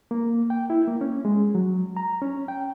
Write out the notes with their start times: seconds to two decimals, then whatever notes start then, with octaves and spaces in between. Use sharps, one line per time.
0.11 A#3
0.50 G5
0.70 E4
0.88 A#3
1.01 C#4
1.25 G#3
1.55 F#3
1.97 A#5
2.22 C#4
2.48 G5